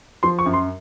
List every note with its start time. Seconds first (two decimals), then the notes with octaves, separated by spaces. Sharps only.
0.23 F3 C6
0.39 C#6
0.46 F#2
0.54 C6